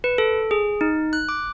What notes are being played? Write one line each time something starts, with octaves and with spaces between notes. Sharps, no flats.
B4
A4
G#4
D#4
F#6
D6